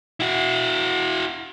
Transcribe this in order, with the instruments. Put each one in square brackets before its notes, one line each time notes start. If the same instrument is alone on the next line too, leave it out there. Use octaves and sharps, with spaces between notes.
[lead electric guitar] E4 F#4